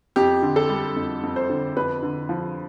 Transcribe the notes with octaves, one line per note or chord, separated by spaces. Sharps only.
F2 G4
D3
A4
G3
F2
F2
C5
D3
F2 B4
D3
F3